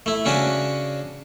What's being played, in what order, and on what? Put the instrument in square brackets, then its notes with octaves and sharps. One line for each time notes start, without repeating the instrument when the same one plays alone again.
[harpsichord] A3 E4
C#3 C#4 D4 F#4 B4 A5